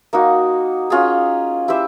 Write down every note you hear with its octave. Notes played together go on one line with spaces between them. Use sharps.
A#3 D#4 F#4
C#4 F4 G#4
E4 G4 C5 E5